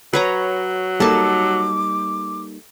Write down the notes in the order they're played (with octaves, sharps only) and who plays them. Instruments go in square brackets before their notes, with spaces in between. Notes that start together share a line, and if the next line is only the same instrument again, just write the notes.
[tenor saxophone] F#3 [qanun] B4 C#5 A#5
[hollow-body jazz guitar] G3 A#3 D#4 [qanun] A4 A5 [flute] D6